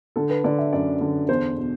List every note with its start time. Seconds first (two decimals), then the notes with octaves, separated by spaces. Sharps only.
0.16 D3 A4
0.30 B4
0.44 D3 D5
0.58 E5
0.73 F#2 D5
1.01 D3
1.28 E2 C5
1.57 B2